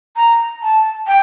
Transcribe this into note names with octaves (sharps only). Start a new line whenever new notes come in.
A#5
A5
G5